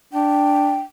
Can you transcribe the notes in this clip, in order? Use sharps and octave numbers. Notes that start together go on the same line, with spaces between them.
D4 G5